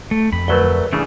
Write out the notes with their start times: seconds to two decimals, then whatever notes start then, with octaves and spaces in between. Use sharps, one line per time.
0.11 A3
0.33 F2 B5
0.48 D2 F#3 A3 A#4 B4 G7
0.93 C#3 E3 A3 D4 G#4